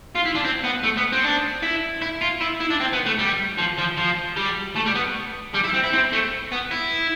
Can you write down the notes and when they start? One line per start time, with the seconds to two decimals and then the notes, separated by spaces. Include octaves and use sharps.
0.15 F4
0.25 E4
0.35 D4
0.45 C4
0.64 B3
0.84 A3
0.98 B3
1.12 C4
1.23 D4
1.62 E4
2.02 E4
2.21 F4
2.41 E4
2.60 E4
2.70 D4
2.80 C4
2.93 B3
3.06 A3
3.19 G3
3.58 F3
3.78 F3
3.97 F3
4.37 G3
4.76 A3
4.86 G3
4.95 B3
5.54 G3
5.64 E4
5.74 C4
5.83 E4
5.93 C4
6.12 A3
6.52 B3
6.71 E4